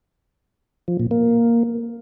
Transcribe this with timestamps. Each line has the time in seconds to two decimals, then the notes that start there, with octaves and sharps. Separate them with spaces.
0.88 F3
0.99 A#2
1.11 A#3